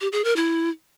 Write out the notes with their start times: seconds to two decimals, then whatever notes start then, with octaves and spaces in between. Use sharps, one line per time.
0.01 G4
0.12 G#4
0.24 A#4
0.36 E4